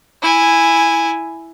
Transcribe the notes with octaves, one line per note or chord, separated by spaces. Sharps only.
E4 G#5